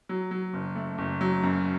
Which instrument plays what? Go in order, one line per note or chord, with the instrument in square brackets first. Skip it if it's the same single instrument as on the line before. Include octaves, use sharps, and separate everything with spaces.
[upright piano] F#3
F#3
F#1
A3
F#1
F#3
F#2